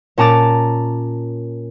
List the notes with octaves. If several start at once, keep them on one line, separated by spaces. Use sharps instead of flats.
A#2 C#4 A5 A#5 D6 A6